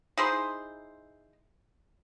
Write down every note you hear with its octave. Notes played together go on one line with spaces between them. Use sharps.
D#4 E4 G#4 C5